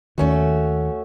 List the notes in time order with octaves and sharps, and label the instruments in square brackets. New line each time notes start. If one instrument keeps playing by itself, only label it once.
[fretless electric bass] D#2 D#3 [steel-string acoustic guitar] A3 C#4 F#4